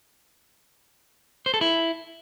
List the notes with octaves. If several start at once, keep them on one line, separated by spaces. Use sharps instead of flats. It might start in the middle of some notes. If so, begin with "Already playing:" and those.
C5
A4
E4